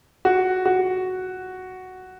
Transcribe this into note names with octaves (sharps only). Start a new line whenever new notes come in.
F#4
F#4